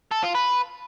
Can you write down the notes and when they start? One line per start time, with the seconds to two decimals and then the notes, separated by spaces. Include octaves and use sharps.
0.11 A4
0.23 F4
0.35 B4